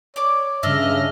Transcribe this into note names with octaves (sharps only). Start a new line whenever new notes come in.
C#5 D5 D6
G2 C#3 D4 D#5 E5 E6 F6 A#6